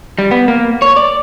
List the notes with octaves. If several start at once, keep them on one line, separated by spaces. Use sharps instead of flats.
G3
B3
A#3
C#5
D5